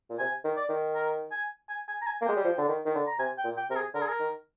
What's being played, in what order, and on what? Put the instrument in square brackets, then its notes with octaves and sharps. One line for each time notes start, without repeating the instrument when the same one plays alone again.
[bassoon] A#2
[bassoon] C3 [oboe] G#5
[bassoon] D#3
[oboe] D5
[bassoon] D#3
[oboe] A#4
G#5
G#5
G#5
A#5
G#5
[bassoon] A#3
[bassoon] G#3 [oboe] G5
[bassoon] G3
F3
D3
D#3
D#3
D3
[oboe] A#5
[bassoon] C3 [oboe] G#5
[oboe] G5
[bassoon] A#2
[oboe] G5
[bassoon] C3 [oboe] A#4
[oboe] G#4
[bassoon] D3 [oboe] A#4
[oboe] G#4
A#4
[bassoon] D#3